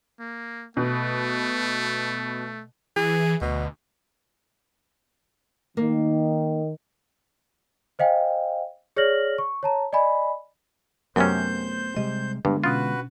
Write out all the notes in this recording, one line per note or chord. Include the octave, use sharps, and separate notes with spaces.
A#3
B2 A3
E3 G#4
D2 B2
D#3 A#3
C5 D#5 F5 G5 G#5
G#4 C#5 D5 F6 A#6 F#7
C#6
C#5 A5 A#5
D5 D#5 G#5 B5
F#2 C3 F#3 A3 B3 C#4 C5 G6
C3 G3 G#3 D#5
G2 D3 G#3 B3 D4
B2 C#4 F4 F#4 B4